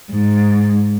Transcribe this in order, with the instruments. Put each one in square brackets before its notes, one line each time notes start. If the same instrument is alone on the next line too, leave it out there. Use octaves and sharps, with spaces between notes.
[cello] G#2